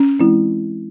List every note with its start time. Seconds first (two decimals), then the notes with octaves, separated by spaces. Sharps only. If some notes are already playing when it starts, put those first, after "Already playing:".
Already playing: C#4
0.20 E3 G#3 C4 E4